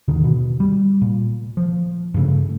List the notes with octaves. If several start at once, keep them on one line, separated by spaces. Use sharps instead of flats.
D#2 G#2 D3 D#3
B2
G3
A#2
F3
G2 C#3 A3